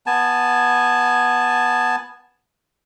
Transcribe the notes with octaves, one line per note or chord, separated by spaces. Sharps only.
B3 G#5 A5